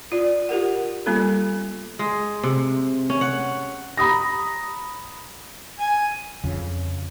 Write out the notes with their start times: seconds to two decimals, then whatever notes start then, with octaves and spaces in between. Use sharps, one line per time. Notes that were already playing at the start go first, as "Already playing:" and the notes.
0.12 F4 D5
0.49 F4 G4 A#4 F#5
1.06 G3 A#3 B3 C#4 F4 A4
1.99 G#3
2.43 C3
3.10 C#4
3.21 F#5
3.97 A#5 B5 D#6 A#6
5.79 G#5
6.44 F2 C#3